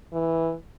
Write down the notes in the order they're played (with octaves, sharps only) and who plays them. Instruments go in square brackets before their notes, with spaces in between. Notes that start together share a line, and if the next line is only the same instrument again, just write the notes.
[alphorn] E3